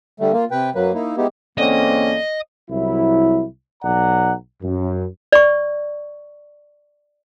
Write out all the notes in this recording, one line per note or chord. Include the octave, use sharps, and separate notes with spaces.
D3 G3 A3
A#3 F4
C3 B4 G5
F#2 F#3 A#3 B4
A#3 D#4 E4
G#3 B3 D#4 E4 G4
E2 D3 A#3 C4 C#4 D#5
C2 F#3 E4
B1 D5 F#5 A#5
F#2
D5 C#6